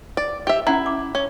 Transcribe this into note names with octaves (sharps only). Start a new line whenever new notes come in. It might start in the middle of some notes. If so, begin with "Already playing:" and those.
D5
G4 E5
C#4 E4 F#5 A#5
D6
C#4